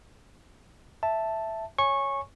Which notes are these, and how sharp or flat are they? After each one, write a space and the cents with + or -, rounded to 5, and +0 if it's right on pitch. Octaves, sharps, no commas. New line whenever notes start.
E5 +0 A5 +0
C#5 +0 G#5 +0 C#6 -15